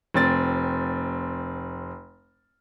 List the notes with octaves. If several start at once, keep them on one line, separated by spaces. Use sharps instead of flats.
F1 C4 A6